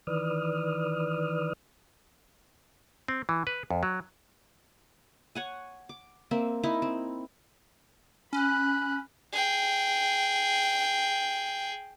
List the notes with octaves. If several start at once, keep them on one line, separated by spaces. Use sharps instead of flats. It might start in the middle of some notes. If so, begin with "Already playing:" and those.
D#3 E3 B4 D5 D#6 F6
C4
E3
B4
F2
F#3
C#5 F#5 G#5
D6
A#3 C4 E5
D#4 E4
C4
C#4 B5 F#6
G#4 G5